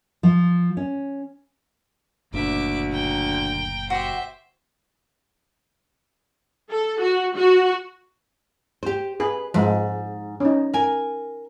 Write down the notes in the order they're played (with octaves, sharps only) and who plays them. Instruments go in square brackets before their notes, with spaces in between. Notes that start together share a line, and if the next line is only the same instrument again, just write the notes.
[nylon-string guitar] F3
C#4
[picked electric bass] F#1 A#2 [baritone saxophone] D2 [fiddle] E5 D6
[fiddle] G5 A#5
[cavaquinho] F#4 G4 [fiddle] C5 E5
[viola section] A4
F#4
F#4
[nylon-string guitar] G4 C5
[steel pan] G#4 [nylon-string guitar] B4
[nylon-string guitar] G#2 [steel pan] F3 G#3
[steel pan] C#4 D#4
[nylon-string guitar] A#4 G#5